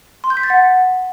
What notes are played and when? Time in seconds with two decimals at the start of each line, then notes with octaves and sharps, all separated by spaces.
0.24 C6
0.30 G6
0.37 B6
0.43 A6
0.50 F#5